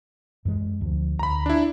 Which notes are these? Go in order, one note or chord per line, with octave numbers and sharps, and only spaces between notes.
F#2 E3 G#3
D2 F3
D2 A#5 B5
D4 E4